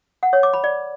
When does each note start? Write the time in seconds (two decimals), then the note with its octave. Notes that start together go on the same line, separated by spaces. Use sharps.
0.23 F#5
0.33 C#5
0.43 D6
0.53 B5
0.64 D5